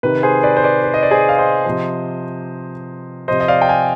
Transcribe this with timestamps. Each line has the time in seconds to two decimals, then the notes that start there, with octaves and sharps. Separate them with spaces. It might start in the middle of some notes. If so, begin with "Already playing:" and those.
0.03 C3 D#3 B4
0.23 G#4 C5
0.43 B4 D5
0.57 C5
0.64 B4 D5
0.84 B4
0.94 D#5
1.03 D5
1.11 G#4 C5
1.29 F5
1.38 C5 D#5
1.65 C3 F3
3.28 C3 F3 C5 D#5
3.40 D#5
3.48 D5 F5
3.62 G5
3.69 F5 G#5